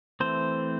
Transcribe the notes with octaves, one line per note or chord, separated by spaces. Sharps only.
E3 A3 C4 C5